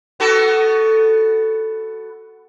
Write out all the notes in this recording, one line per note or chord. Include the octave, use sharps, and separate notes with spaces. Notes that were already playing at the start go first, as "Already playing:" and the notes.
B3 F#4 A4